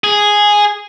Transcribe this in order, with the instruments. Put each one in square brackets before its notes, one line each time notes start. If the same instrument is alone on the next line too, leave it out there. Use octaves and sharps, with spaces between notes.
[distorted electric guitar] G#4